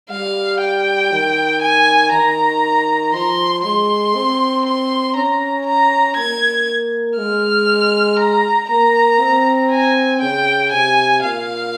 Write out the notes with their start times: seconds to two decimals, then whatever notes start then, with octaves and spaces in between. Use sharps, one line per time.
0.10 G3 F5
0.61 G5
1.12 D#3
1.62 G#5
2.12 D#3 A#5
3.13 F3 C6
3.64 G#3 C6
4.15 C4
4.65 C6
5.16 C#4 A#5
5.66 A#5
6.17 A#3 G#6
7.18 G#3 F6
8.19 A#5
8.70 A#3 A#5
9.20 C4
9.71 G#5
10.21 C#3 G5
10.72 C3 G#5
11.22 A#2 F5